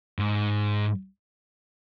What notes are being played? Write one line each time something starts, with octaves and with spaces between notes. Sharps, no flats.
G#2